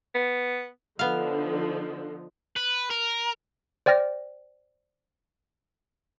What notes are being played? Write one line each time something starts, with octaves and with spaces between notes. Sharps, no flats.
B3
D3 F3 B3 D#4 F5
B4
A#4
C5 D5 G5 F6 A#6